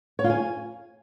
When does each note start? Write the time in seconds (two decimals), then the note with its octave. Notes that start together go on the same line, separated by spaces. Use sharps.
0.19 C#5
0.24 F4
0.30 G#5